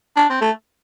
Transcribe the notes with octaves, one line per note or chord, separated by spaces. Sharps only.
D4
C4
A3